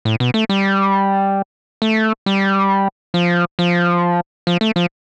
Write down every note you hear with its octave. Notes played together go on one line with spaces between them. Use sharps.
A2
B2
A3
G3
A3
G3
F3
F3
F3
A3
F3